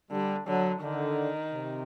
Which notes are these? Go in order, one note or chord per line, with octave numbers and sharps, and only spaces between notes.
D3 G3
D3 F#3
D3 D#3
C3